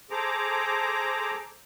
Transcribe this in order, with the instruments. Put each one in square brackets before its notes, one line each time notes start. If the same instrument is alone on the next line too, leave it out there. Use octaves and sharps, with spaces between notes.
[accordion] G#4 A4 C5 A#5 D6